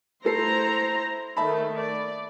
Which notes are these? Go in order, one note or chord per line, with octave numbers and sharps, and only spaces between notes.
A3 E4 A4 C5 A#5 C7
D#3 A3 E5 A5 B5
D5